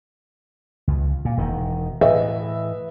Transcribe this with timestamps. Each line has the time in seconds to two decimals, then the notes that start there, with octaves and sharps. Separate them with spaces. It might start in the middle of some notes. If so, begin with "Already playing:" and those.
0.87 C#2
1.25 A#2
1.37 E1 D#3
2.01 A2 E3 B4 D#5 E5